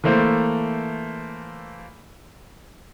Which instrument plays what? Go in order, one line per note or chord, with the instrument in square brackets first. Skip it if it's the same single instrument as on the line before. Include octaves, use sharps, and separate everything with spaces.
[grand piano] E3 A3 A#3 A4 C5